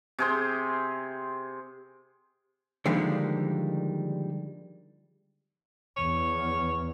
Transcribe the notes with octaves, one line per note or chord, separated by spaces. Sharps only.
C3 G#4 C5
D3 D#3 F3 G3 G#3 A#3
E2 C#5